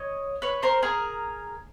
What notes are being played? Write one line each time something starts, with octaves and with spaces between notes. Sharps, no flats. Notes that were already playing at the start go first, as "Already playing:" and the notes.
Already playing: C#5 D#5
B4 C#5
A#4 C5
G#4 A#4